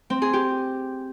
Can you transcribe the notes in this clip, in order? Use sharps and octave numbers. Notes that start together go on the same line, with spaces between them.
C4
G#4
G4